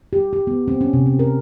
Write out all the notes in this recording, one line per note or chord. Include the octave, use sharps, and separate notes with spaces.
G4
G4
B3
C4
C#4
C3
C#4
A#4